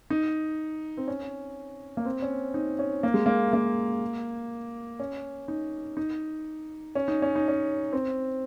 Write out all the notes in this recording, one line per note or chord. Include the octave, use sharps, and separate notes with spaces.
D#4
C4
C#4
A#3
C4
C#4
D#4
C#4
A#3
G#3
A#3
A#3
C#4
D#4
D#4
C#4
D#4
C#4
D#4
C#4
C4